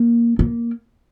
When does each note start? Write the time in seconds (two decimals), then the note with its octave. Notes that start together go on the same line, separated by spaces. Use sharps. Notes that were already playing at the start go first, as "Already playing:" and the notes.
Already playing: A#3
0.39 A#3